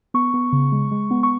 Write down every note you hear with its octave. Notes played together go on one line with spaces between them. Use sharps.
B3 C#6
B3
C#3
G#3
G#3
B3
C#6